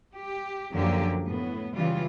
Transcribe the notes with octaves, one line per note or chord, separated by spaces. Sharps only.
G4
F#2 D3 F3 A#3 G4
A2 B3
C#3 E3 G3 F4